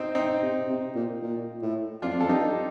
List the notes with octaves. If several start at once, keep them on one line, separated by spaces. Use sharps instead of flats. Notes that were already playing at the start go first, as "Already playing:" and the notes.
Already playing: C4 D#4
C4 D#4
C3
C3
A#2
A#2
A2
F2 D4 F4
F2 A4
G2 D#4 G4